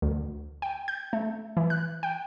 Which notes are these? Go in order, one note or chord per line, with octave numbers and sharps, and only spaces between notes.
D2
G5
G6
A3
E3
F#6
G5